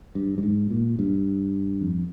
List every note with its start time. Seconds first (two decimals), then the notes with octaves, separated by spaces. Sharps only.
0.15 G2
0.38 G2
0.43 G#2
0.70 A#2
0.99 G2
1.81 F2